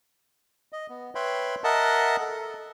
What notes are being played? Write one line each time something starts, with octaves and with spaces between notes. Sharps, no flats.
D#5
B3
B4 C#5 E5 G5 B5 C6
A#4 D#5 E5 F#5 A5
A4